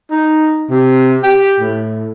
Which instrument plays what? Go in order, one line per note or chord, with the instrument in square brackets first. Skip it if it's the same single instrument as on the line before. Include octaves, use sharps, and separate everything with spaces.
[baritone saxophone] D#4
C3
G4
A2